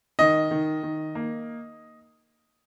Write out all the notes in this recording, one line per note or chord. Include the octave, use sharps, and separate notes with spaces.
D#3 D#5
D#3
D#3
A#3